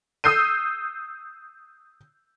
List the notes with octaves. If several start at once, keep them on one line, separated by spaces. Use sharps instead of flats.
D#6 E6 G6 C7 D#7